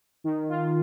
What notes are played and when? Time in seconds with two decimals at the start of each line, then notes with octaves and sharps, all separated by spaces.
0.24 D#3
0.49 F4